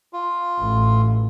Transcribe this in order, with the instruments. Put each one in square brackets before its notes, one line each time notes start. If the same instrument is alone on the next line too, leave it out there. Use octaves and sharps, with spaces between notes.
[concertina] F4
[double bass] A1